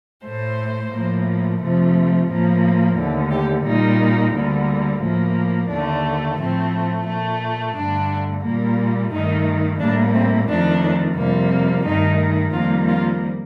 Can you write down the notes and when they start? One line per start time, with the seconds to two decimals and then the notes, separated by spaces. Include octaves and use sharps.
0.24 A2 A3 C5
0.92 A2 F3 A#3
1.60 F2 C3 F3 A3
2.28 A2 F3 A#3
2.97 D#2 D3 A3
3.31 G4
3.65 A#2 G3 A#3 D#4
4.33 D2 D3 G3 A#3
5.02 A2 F3 A#3
5.70 D#2 D3 A3 D4
6.38 A2 F3 A3 C4
7.07 A#2 A3
7.75 G2 D3 A3 D4
8.44 A#2 G3 A#3
9.11 G2 D#3 A3 D#4
9.79 A2 G3 A#3 D4
10.14 C4
10.48 F2 D#3 A3 D4
11.16 F2 C3 G3 A#3
11.84 G2 D#3 A3 D#4
12.52 F2 D#3 G3 A#3 F4
12.88 F4